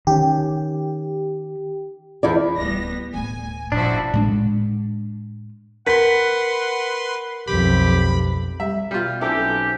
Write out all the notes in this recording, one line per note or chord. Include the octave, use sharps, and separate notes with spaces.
D#3 C#4 G4
E2 E4 D5
D1 G3 A3 B3 A#6
D1 A2 G#5
G1 A#2 F3 D4 E4 F#4
A2 G#3 D4
A#4 B4 F#5 C6 B6
B1 F2 G4 B5
G3 E5
B2 G3 F4
B1 C4 C#4 E4 G4 A4